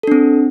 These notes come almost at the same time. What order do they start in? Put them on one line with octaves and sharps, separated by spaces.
A4 D4 C4